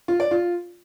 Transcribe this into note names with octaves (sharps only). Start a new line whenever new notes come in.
F4
D5
F4